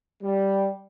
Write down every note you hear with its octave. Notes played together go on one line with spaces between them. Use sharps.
G3